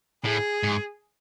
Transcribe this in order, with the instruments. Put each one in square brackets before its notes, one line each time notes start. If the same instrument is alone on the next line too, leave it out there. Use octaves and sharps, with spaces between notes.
[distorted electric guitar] A2 [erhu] G#4
[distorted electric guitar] G#2